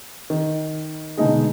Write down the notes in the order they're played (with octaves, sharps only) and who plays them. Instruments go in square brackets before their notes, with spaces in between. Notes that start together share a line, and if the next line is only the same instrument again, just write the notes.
[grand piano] D#3
B2 D3 G#3 A3 D#4 G#4